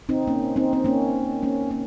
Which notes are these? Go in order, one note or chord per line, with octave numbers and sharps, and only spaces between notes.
C4 D#4
A#3 C#4
C4 D#4
C4
A#3 C#4
A#3 C#4
A#3 C#4